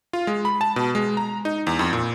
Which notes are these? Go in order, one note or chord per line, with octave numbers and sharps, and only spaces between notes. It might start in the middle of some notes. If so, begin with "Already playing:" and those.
F4
G#3
B5
A5
B2
G#3
A#5
D#4
E2
F2
A#2